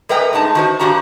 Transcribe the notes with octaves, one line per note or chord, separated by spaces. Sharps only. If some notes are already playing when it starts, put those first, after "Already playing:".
G3 A3 A#4 B4 D#5 G5
G2 G#3 D#4 A5
D#3 F#4 C5
G2 A#2 G3 F#4 G4 A#5